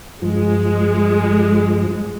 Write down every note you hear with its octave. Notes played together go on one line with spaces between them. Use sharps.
G2 F3 G#3